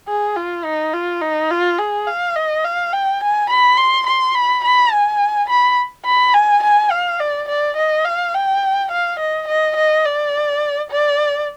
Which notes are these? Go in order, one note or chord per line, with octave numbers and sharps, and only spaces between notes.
G#4
F4
D#4
F4
D#4
F4
G#4
F5
D#5
F5
G5
G#5
B5
C6
C6
B5
B5
G#5
B5
B5
G#5
G#5
F5
D5
D5
D#5
F5
G5
F5
D#5
D#5
D#5
D5
D5